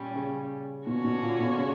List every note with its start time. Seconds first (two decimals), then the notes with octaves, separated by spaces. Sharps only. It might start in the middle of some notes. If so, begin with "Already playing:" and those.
Already playing: A#2 G3 C#4
0.16 C#3
0.87 B2 D3 A#3 C#4 F#4 C#5
1.04 B2
1.23 A#2
1.40 B2
1.58 C#3